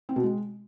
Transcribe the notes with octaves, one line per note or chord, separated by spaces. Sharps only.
C4
B2
G#3